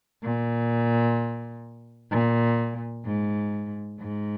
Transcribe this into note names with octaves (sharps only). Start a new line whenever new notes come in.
A#2
A#2
G#2
G#2